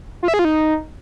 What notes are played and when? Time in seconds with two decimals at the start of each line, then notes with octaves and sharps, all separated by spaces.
0.23 F4
0.28 E5
0.34 G#4
0.39 F4
0.45 D#4